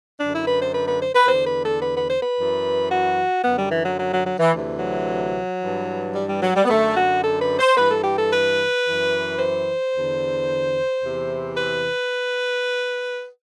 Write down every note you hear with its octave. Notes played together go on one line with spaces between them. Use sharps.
F#2 D3 D4
E4
B4
C5
B4
B4
C5
B4
E2 D3 C5
B4
A4
B4
B4
C5
B4
F#2 E3
F#4
F#2 D3 B3
G3
E3
F#3
F#3
F#3
F#3
E3
D2 C3 E3
F#3
G2 E3
G3
G3
F#3
G3
B3
F#2 D3 A3
F#4
A4
B4
C5
G2 E3 B4
A4
G4
A4
B4
F#2 E3
C5
E2 D3
E2 C3 E3
B4